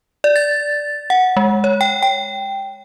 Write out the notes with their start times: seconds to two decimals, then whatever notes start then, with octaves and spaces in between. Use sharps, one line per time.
0.24 D5
0.36 A6
1.10 F#5
1.37 G#3
1.64 C#5
1.81 G5
2.03 G5